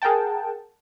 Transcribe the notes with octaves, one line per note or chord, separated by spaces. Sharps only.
G#4 A#4 F#5 G5 A5